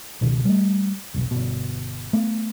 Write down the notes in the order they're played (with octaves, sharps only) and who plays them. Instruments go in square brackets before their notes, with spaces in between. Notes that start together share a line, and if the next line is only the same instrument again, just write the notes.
[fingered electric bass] C#2 B2 D#3
G3 A3
F1 B1
G1 B2
A3 B3